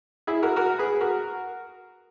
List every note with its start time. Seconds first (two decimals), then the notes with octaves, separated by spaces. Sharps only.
0.27 E4 G#4
0.43 F#4 A#4
0.56 F#4 A#4
0.79 G#4 B4
1.01 F#4 A#4